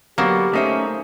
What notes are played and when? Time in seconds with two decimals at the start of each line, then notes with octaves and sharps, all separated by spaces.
0.18 D3 F#3 A#3 B3 G4
0.53 A3 C#4 D#4 C5 E5